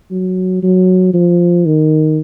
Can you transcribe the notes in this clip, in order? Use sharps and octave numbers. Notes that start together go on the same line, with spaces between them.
F#3
F#3
F3
D#3